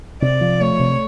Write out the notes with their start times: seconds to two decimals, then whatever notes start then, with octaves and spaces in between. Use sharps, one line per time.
0.22 C3 D5
0.41 F3
0.61 A3 C#5
0.79 C3